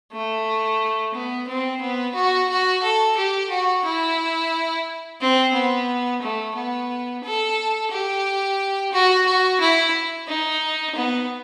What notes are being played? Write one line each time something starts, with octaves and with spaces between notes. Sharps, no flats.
A3
B3
C4
B3
F#4
F#4
A4
G4
F#4
E4
C4
B3
A3
B3
A4
G4
F#4
F#4
E4
D#4
B3